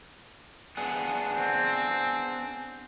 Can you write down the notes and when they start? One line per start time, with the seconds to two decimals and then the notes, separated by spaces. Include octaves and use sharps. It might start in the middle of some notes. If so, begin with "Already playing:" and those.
0.77 B3 D4 G#4
1.36 C4